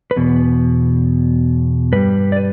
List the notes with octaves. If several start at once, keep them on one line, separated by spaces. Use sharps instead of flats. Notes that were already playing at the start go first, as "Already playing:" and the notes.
B4
E2 B2
G2 G3 B4
D5
B4